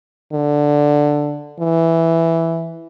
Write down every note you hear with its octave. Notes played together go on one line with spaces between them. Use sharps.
D3
E3